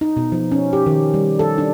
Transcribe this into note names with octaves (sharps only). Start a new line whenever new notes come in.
D#4
B2
F3
C#4
G4
D#3
G3
A4
D4